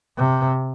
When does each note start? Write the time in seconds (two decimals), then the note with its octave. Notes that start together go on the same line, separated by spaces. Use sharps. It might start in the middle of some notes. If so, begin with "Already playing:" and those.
0.17 C3